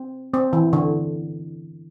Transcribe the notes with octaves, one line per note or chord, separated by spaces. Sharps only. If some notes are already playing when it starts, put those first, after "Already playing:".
Already playing: C4
C4
E3
D3